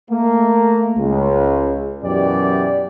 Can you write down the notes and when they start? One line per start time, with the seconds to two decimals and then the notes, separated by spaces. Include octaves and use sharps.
0.10 A3 A#3
0.98 C#2
2.04 F#2 B2 E3 G4 D5